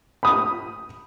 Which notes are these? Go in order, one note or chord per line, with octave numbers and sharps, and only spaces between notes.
B5 D#6